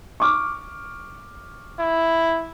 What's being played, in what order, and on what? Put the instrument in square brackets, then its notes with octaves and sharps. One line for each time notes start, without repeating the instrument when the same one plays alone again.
[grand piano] C#6 D6 F6
[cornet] E4